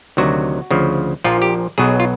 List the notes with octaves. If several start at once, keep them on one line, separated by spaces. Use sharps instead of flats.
D2 C3 D#3 F#3 F#4
D2 C#3 F3
A#1 A#2 F3 F4
G4
B1 B2 F#3 G#4
F4